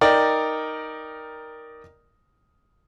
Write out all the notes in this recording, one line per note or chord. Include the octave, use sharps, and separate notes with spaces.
D#4 A#4 D5 G5